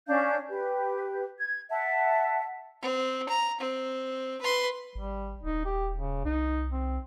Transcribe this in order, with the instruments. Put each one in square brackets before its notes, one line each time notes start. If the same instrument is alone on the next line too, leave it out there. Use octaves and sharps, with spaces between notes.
[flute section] C#4 D4 F5 G6
G4 B4
G#6
E5 F#5 A5
[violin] C4
A#5
C4
B4 C6
[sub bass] G#1 [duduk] G3
[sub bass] D#1 [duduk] D#4
[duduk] G4
C#3
[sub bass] C2 [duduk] D#4
[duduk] C4